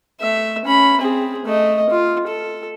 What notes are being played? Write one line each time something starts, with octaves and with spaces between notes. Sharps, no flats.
A3 E5
C#4 B5
C4 G#4
A3 D#5
F4
A4